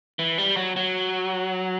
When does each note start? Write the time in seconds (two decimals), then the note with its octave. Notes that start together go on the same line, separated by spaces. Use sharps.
0.19 E3
0.38 G3
0.56 F#3
0.76 F#3